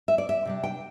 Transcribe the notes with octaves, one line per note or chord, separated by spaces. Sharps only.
E5
D5
E5
C3 G3 D4
G5